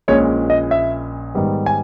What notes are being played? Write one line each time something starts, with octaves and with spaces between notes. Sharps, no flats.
A#1 A#2 G#3 C#4 C#5
D#5
E5
G#2 D#3 G3 B3
G#5